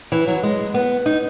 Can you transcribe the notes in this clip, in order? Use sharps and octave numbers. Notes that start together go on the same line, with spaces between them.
E3
F#3
G#3
B3
D#4